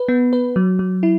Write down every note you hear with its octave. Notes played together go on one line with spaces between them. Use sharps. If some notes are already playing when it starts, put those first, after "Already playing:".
Already playing: B4
B3
B4
F#3
F#3
E4